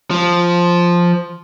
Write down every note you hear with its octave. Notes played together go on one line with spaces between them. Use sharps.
F3